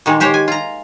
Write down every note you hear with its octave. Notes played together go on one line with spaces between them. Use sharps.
A#2 D#3 G#3 A#3
G#3 G4 C5 C#5
G#5
F4 A#5